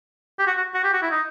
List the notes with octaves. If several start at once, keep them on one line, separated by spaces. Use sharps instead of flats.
G4
F#4
F#4
F#4
G4
F#4
E4
D#4